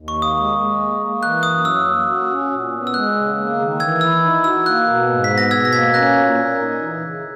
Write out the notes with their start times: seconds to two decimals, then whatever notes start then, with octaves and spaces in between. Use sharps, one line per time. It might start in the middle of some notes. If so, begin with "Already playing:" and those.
Already playing: D#2
0.08 C#6
0.15 A#3
0.22 D#6
0.36 G#3
0.58 G#3
0.79 A#3
1.00 A#3
1.22 E3 F#6
1.43 F#2 D#6
1.65 F#3 E6
1.87 A#3
2.08 F#4
2.30 C#4
2.51 A#2
2.73 B3
2.87 E6
2.94 G#3 F#6
3.15 C#3
3.37 A#3
3.58 D#3
3.79 E3 E6 G#6
4.01 E4 E6
4.23 D#4
4.44 F#4 E6
4.66 A#3 F#6
4.87 B2
5.09 G#2
5.24 B6
5.30 B3
5.38 A#6
5.51 B2 E6 G#6
5.65 A#6
5.73 A#3 G#6 B6
5.94 C#4 F#6 A#6
6.16 A#2
6.37 A#4
6.59 D#4
6.80 E3
7.02 C#3